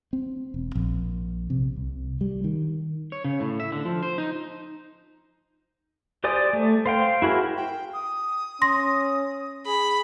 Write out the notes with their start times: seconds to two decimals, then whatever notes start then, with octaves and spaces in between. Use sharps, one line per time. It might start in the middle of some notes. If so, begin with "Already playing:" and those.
0.13 C4
0.54 E1
0.75 A#1
1.50 C3
1.76 C2
2.21 G3
2.44 D#3
3.12 C#5
3.24 C#3
3.40 A2
3.60 E5
3.72 D3
3.85 F3
4.03 C5
4.18 D#4
6.24 G4 C5 D5 G#5 D#6
6.53 A3
6.86 C5 F5 G5
7.22 E4 F#4 G#4 A#4 E5
7.57 G5
7.93 D#6
8.62 C#4 C6 A#6
9.67 G#4 B5